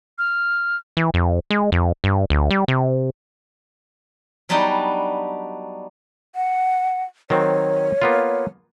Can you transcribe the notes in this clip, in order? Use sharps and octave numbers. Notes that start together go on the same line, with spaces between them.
F6
E3
F2
G#3
F2
G2
D2
G3
C3
F#3 G3 B3 D4 D#4 G4
F#5
D#3 F#3 C4 C#5
A#3 B3 F4